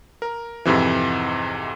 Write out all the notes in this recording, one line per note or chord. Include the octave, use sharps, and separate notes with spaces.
A#4
F2 G#2 C3 E3